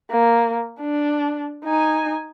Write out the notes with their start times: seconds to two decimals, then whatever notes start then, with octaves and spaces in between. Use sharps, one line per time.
0.11 A#3
0.81 D4
1.64 D#4 G#5